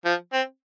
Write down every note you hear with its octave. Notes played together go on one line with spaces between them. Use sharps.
F3
C4